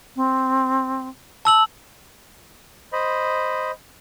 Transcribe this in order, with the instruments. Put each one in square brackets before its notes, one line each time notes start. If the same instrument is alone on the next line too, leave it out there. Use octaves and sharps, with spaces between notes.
[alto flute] C4
[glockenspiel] A5 E6 F#7
[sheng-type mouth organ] C5 D#5 B5